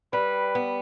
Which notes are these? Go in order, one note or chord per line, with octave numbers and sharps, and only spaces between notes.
G3 B4
B3